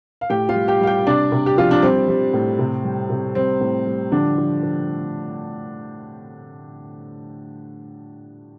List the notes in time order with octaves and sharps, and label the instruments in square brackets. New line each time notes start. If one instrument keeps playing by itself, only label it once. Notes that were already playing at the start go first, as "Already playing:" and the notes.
[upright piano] F5
A2 G4 G5
F4 F5
G3
G4 G5
G3 F5
G4 G5
C3 D4 D5
C3
G4
F3 F4
D4
G3 C4
G3
A2
C3
G3
C3
G3 C4
A2
G3
D3 F3 D4
F3
F3